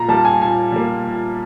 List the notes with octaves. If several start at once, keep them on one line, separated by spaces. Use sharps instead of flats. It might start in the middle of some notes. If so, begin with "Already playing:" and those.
Already playing: A#2 A#5
G3 A#3 A5
G#5
A#2 G#5
G3 A#3
A#2